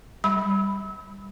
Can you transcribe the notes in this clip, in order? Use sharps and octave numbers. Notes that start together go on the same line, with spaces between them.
G3 B5